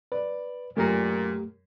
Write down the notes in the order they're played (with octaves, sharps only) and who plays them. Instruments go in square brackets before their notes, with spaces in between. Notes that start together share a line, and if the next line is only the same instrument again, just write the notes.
[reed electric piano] B4 [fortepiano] D5
[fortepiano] F#2 A#4 [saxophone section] A#2 [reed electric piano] A3 G4